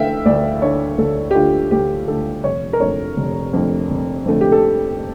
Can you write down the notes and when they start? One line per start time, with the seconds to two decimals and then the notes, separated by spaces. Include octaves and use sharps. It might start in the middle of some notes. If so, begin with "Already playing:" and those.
Already playing: D3 A3 E5 F5 G5
0.25 D2 D5
0.62 D3 A3 C#5
0.98 D2 A4
1.31 G4
1.35 D3 A3 F4
1.71 D2 G4
2.07 D3 A3 A4
2.44 F1 C#5
2.73 A#4
2.80 F2 D3 A3 C#5
3.16 F1
3.53 F2 D3 A3
3.90 F1
4.26 F2 D3 A3
4.41 G4
4.52 A4